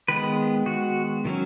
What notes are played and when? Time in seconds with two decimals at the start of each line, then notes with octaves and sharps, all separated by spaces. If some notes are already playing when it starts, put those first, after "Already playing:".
0.08 D#3 G#3 B3 B4
0.66 F#4
1.25 D#3 F#3 C#4